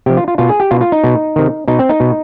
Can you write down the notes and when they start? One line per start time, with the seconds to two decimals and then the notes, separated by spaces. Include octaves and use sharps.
0.06 C3 F3 G4
0.17 F4
0.28 F4
0.38 B2 F4
0.49 G#4
0.60 G4
0.71 B2 F4
0.81 F4
0.92 D#4
1.04 B2
1.36 C3 D#3
1.68 B2 D#4
1.79 C4
1.89 D#4
2.00 B2